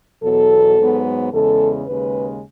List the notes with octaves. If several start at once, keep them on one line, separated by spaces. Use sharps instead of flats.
E2 B2 F#3 A4
G#2 F#3 B3
E2 C#3 G#3 A4
D#2 C#3 G#3 B4